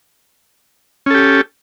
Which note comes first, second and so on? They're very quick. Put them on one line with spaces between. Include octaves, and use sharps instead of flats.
C#4 A4 G4